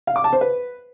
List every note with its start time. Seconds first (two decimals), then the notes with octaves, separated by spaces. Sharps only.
0.07 F5
0.16 D6
0.24 A5
0.33 C5
0.41 B4